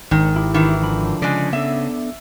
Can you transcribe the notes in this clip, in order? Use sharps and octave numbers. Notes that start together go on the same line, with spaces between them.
G#1 D#3
E4 G4
D#3 E3
D3 F3 B5
C#3 G#3 D5
B3 D4 A4 E5